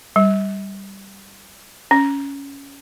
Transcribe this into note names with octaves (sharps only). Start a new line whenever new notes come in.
G3
C#4